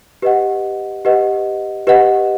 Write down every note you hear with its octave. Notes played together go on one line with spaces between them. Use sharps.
G4 B4 D#5 F#5
G4 B4 D#5 F#5
G4 B4 D#5 F#5